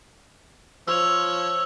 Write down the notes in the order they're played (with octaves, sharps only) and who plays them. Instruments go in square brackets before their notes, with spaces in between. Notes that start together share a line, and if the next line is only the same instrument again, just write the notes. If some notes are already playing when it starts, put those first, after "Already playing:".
[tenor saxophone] F3 [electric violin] C#5 [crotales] E6 F7